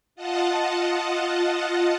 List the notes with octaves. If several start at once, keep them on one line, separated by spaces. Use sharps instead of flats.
F4 D#5 F#5 A5